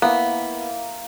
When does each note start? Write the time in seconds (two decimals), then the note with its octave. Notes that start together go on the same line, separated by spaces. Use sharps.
0.02 A#3 B3 E4 E5